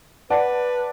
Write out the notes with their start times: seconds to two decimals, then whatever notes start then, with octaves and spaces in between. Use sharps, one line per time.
0.30 B4 D5 F#5 A5